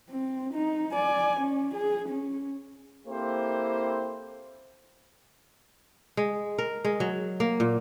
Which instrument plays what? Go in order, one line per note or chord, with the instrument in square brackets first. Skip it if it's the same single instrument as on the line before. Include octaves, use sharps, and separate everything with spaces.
[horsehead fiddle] C4
D#4
D5 G#5
C#4
G#4
C#4
[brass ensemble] A#3 C4 E4 G4 A4 C5
[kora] G#3
A#4
G#3
F#3
A#3
A#2